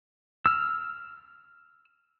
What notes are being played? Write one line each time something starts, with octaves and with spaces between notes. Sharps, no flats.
E6 F6